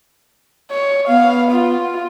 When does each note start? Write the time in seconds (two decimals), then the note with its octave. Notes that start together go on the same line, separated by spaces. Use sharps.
0.71 C#5
1.08 B3 F5
1.52 F4